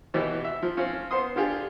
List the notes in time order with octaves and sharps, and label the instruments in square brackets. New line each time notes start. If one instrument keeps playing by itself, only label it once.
[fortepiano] B2 E3 G4 B4
E5
F3
C4 C#4 F4
B3 C5 C6 D#6
D3 F4 G4 G#4